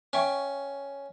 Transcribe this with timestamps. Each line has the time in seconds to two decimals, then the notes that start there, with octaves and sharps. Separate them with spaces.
0.13 C#4 E5 G5 C#6